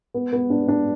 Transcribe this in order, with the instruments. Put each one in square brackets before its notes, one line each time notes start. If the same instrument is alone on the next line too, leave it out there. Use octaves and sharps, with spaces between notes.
[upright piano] B3
B3
D4
D4